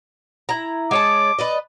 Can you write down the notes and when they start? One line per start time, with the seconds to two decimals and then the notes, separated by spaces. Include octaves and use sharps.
0.49 E4 A#5
0.91 G#3 C#5 A5 D6
1.39 B4 D5 D#5